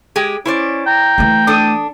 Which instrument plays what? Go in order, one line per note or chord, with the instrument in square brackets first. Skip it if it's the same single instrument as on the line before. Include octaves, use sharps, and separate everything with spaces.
[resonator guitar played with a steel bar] G#3 G4 G#4
[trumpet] C#4 [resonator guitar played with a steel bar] E4 C5 D5
[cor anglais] G5 [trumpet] A#5
[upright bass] E3 A3
[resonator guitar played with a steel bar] D4 A4 [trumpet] D#6